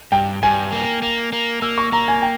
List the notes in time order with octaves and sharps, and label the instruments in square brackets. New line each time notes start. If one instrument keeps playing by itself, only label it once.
[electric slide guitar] G2 [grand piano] G5
[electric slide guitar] G2 [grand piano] G#5
[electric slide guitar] A#3
A#3
A#3
[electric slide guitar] A#3 [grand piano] E6
[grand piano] C#6
[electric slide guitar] A#3 [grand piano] A#5
[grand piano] G#5
G5